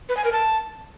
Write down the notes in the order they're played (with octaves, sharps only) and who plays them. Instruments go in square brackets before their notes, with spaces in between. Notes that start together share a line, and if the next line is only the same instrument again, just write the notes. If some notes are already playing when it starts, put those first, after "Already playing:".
[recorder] B4
G#5
A#4
A5